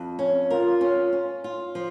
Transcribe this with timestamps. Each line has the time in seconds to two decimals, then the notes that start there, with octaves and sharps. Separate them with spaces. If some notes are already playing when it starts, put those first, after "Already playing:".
Already playing: F2
0.19 C#4
0.50 F4 A#4
0.81 C#4
1.12 C#4
1.44 F4
1.75 F3